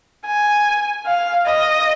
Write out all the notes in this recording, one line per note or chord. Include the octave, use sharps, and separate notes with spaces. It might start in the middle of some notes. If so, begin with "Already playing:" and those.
G#5
F5
D#5